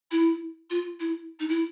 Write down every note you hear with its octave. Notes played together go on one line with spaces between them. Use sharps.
E4
F4
E4
D#4
E4